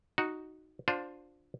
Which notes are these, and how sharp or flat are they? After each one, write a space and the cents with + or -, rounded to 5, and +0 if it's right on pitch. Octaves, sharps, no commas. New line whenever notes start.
D#4 +0 F#4 +0
D4 +0 F4 +25 C5 +0